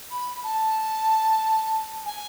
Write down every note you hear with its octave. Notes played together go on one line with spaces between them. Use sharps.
B5
A5
G#5